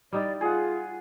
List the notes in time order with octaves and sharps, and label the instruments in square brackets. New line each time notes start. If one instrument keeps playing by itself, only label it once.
[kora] G3 D#4 E4 [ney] D5
[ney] F4 [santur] G#4 F#5